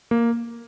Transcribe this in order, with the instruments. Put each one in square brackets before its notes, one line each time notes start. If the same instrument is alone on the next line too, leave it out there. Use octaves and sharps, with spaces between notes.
[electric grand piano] A#3